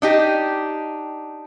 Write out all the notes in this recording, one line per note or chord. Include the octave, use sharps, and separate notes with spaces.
D4 D#4 G4